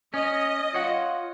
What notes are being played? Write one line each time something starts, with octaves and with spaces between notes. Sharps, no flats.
C#4 D#5
F4 C#5 F#5